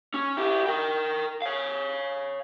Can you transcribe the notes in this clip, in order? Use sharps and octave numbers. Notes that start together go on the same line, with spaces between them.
C#4
E4 G4
A#4 G5
C#5 F5